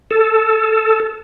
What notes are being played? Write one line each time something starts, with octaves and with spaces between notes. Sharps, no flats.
A4